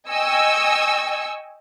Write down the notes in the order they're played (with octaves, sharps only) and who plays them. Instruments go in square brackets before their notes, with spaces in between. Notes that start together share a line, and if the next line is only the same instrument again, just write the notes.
[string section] D#5 G5 G#5 C#6 E6